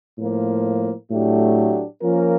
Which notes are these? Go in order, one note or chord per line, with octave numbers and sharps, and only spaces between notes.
A2 F3 A#3
A2 F#3 A3 D4 G4
F3 A#3 C#4 F4 A#4